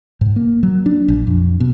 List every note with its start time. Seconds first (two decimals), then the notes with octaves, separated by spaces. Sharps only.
0.21 G#2
0.36 A#3
0.63 F#3
0.86 D4
1.08 A#1
1.27 F2
1.60 B2